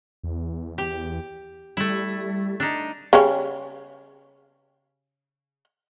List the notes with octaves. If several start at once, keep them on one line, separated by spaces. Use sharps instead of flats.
E2
G4
G3 A3 E4
D4 D#4
C#3 G3 C#4